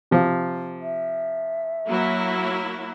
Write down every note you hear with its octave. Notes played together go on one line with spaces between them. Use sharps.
C3 F3
E5
F#3 A#3 E4